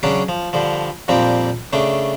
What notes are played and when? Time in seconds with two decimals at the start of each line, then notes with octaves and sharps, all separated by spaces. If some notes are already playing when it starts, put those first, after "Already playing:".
0.03 C#3 F#3 C#4 D4
0.29 F3
0.53 G2 D3 F3
1.08 F2 A#2 F3 G3 C4
1.73 C#3 A3 D4